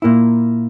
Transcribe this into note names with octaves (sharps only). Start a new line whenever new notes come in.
A#2 A#3 E4